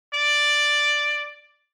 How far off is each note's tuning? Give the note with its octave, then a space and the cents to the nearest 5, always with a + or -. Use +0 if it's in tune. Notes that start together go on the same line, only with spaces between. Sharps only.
D5 +5